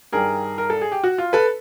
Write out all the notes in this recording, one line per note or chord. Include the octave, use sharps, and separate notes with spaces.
G2 D#3 G3 G#4 A#4
A#4
A4
G#4
G4
F#4
F4
A4 B4